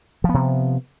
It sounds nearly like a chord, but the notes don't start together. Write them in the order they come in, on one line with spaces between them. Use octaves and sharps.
F3 B3 C3